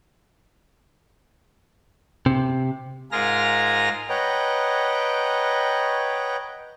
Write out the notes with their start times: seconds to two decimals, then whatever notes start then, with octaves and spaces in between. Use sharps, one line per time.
2.26 C3
3.12 G#2 F4 G#4 A#4 F6 A#6
4.09 B4 C#5 D#5 F#5 G5 A#5